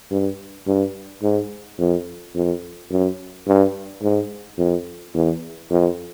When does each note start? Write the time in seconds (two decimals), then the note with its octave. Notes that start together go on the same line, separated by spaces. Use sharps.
0.11 G2
0.67 G2
1.23 G#2
1.79 F2
2.35 F2
2.90 F#2
3.47 G2
4.03 G#2
4.58 F2
5.15 E2
5.71 F2